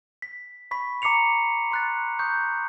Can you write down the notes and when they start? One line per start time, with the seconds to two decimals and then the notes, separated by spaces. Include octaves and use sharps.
0.22 B6
0.71 B5 C#6 B6
1.02 A#5 D6 C7 C#7 F7
1.71 C6 F#6 A6
2.19 C#6 D#6 G6